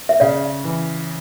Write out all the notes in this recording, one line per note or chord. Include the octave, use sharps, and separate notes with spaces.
E5
C#3 D5 F5
E3